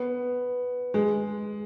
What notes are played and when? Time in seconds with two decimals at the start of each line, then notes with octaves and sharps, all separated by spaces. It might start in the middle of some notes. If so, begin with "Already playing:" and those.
Already playing: B3
0.94 G#3